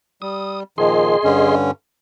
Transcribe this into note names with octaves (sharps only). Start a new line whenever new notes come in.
G3 D#6
A#2 D#3 F3 G#4 D#5 C6
G2 D3 C#4